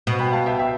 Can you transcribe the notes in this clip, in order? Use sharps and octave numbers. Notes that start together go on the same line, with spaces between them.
B2
G5 B5
F5 A5
E5 G5
E5 G5